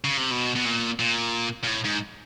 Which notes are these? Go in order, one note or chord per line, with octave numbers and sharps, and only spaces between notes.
C#3
C3
B2
B2
A#2
A#2
A#2
A2
G#2